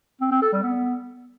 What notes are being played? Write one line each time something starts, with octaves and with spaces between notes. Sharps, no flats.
C4
C4
A4
G3
B3